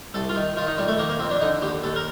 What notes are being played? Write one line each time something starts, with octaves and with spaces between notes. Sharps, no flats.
C2 A4
F4
D#3
D#3 F4
D#4
F2 G3
A3
D#3 A#3
A#3
F2 C4
D4
D3 D#4
D#2 G4
D#2 A4
A#4